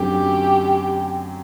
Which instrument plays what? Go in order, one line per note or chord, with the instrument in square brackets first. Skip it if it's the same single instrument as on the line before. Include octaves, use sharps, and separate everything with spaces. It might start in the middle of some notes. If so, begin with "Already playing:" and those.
Already playing: [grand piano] F#2 D3 F#3 A3 C4 [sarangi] G4